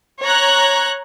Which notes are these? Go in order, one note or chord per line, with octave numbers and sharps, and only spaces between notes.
C#5 A#5 F#6